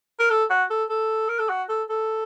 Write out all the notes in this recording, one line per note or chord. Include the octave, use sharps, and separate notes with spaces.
A#4
A4
F#4
A4
A4
A#4
A4
F#4
A4
A4